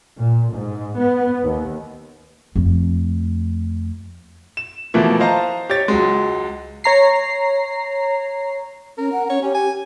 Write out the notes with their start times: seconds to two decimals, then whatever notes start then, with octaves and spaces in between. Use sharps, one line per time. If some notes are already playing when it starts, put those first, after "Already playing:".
0.17 A#2
0.51 G#2
0.98 B3
1.43 D#2
2.55 F2 A3
4.57 E7
4.94 B2 E3 F3 A3 A#3
5.20 C5 D#5 F5 A5 A#5
5.70 G4 C#5 A6
5.88 C#2 F#3 G#3
6.84 C#5 A#5 C7
8.98 C#4 A#4
9.12 F#5
9.30 C#4 C#5
9.42 C#4 G4
9.54 G#5